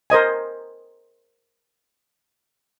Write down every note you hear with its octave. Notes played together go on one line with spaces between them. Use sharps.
A#4 C5 D#5 G#5